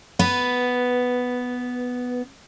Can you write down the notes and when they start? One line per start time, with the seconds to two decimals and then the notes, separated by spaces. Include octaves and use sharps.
0.19 B3 B4